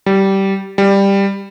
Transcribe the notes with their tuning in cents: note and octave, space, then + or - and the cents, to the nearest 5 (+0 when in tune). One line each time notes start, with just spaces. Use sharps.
G3 -15
G3 +10